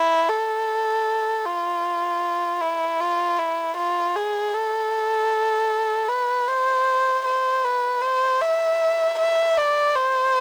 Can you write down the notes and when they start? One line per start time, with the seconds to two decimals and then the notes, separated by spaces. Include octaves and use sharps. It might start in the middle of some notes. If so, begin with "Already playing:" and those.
Already playing: E4
0.29 A4
1.46 F4
2.61 E4
3.00 F4
3.39 E4
3.77 F4
4.16 G#4
4.55 A4
6.09 B4
6.48 C5
7.26 C5
7.64 B4
8.02 C5
8.41 E5
9.19 E5
9.57 D5
9.96 C5